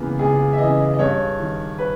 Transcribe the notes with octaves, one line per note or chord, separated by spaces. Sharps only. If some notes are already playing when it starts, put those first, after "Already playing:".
Already playing: C#2 C#3 E3 A#3 B3
C#2 G#4
E5
C#3 E3 D#5
D#5
G2 C#5
D#3
B4